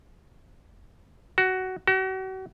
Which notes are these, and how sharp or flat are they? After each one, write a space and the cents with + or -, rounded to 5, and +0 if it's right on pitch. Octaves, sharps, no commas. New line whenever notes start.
F#4 +15
F#4 +40